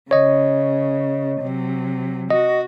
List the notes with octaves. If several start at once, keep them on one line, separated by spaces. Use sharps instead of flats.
C#3 C#5 D#5
C3 F#3
F#4 D#5